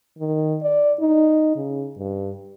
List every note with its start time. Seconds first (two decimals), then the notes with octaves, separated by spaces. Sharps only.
0.19 D#3
0.63 D5
1.00 D#4
1.56 C#3
1.97 G2